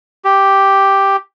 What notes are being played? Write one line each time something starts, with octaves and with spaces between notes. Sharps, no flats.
G4